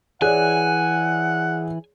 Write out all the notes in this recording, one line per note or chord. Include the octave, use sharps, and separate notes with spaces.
E3 G#4 C#5 D5 F#5 G#5 F#6